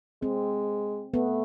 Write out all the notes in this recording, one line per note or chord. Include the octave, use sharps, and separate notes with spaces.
G#3 C4
A3 B3